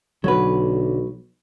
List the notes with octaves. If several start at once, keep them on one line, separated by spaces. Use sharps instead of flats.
B1 D3 F#3 C#4 F#4 B4